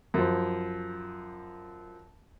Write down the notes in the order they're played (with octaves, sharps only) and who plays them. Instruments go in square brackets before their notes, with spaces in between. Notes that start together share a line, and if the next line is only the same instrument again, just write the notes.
[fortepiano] F#2 F3